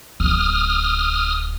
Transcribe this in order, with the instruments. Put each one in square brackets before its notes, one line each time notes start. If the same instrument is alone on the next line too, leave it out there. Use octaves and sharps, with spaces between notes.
[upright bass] D1 B3 [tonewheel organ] D#6 F6